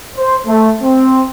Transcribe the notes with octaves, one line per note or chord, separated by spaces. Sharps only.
C5
A3
C4